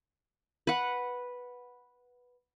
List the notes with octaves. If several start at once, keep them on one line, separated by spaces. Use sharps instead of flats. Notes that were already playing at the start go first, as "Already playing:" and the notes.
B4 F#5